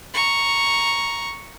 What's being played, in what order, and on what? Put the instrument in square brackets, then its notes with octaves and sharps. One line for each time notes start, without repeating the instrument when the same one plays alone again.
[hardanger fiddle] A#5 C#6